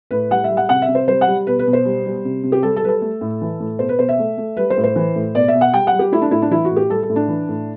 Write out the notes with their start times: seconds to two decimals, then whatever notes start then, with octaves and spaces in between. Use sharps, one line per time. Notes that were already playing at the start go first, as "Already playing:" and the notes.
0.11 A2 B4
0.30 G3 F#5
0.44 E5
0.50 G3
0.57 F#5
0.69 C3 F#5
0.82 E5
0.88 C3
0.95 C5
1.08 G3 C5
1.21 F#5
1.27 G3
1.47 B2 B4
1.59 B4
1.67 B2
1.73 C5
1.85 G3
2.06 G3
2.25 C3
2.43 C3
2.52 G4
2.63 G3 A4
2.76 A4
2.83 G3 B4
2.89 A4
3.01 A3
3.21 A2
3.41 E3
3.60 A2
3.79 B2 C5
3.89 B4
3.99 B2 C5
4.09 E5
4.19 A3
4.37 A3
4.57 G3 B4
4.70 C5
4.77 A2
4.84 C5
4.96 E3
5.16 A2
5.35 B2 D5
5.48 E5
5.54 B2
5.61 F#5
5.73 G3 G5
5.87 F#5
5.93 G3
5.99 G4
6.12 A3 E4
6.22 D4
6.31 A2 E4
6.42 D4
6.51 E3 E4
6.65 F#4
6.71 A2
6.76 G4
6.89 G3 A4
7.03 A4
7.09 A2
7.16 D4
7.28 E3
7.49 A2